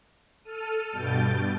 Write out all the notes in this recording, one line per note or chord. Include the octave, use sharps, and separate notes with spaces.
A4 F6 D#7
G2 B2 G6 A6 D7